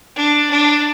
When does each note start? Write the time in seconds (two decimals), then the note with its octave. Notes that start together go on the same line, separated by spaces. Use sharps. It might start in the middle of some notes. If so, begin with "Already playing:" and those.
0.16 D4
0.50 D4